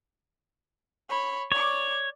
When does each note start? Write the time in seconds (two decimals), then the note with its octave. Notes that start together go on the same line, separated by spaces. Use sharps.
1.09 C#5 B5
1.52 C#5 D5 D6